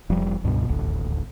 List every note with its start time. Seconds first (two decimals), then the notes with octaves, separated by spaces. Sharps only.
0.09 F1 F3 G3
0.44 C#2 G2 B2
0.68 D#1 A1 D2